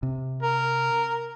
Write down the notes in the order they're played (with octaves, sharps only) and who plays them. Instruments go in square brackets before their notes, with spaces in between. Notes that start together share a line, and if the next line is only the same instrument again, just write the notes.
[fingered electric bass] C3
[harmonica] A#4